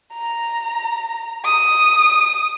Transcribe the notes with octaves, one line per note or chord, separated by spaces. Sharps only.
A#5
D#6